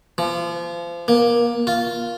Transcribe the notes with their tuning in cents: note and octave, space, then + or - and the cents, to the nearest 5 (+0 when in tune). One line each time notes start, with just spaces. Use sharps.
F3 -30
A#3 +20
F4 +0